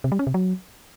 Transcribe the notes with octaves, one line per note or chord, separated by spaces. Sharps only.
C3
G3
C#4
C3
F#3